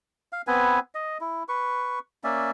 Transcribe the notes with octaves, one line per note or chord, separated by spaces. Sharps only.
F5
B3 C4 B4 G#5
D#5
E4
B4 C#6
A#3 C#4 D5 E5